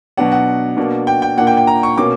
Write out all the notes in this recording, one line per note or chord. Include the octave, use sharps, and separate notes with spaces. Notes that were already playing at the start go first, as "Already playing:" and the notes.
B2 F#3 B3 D4 F#5
F#5
B2 A#3 D4
G5
G5
A#2 A#3 D4 F#5
G5
G5
A#5
C#6
B2 A#3 C#4 D6